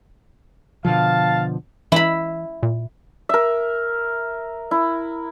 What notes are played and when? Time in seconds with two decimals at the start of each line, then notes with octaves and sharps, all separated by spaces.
0.85 B2 D3 F3 F5 A5
1.92 E3 E4 B5
2.63 A#2
3.29 A#4 E5
4.71 E4